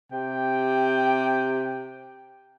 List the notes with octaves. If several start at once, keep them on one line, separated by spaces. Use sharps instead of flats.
C3 G4 G5